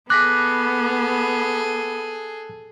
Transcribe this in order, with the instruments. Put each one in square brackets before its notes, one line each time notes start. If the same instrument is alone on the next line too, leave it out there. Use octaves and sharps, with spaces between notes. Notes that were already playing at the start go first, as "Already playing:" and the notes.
[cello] B3 [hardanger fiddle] G#4 A4 [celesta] D6 A#6 B6 [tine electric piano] F#6